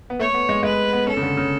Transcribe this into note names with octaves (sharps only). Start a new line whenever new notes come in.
B3
A3 C#5
B3
G#3
G#3 B4
B3
C#4 A4
C#3
D3
C#3